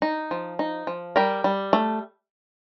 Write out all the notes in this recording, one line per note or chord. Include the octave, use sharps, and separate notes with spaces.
D#4
F3
D#4
F3
G3 G4 A#4
G3
A3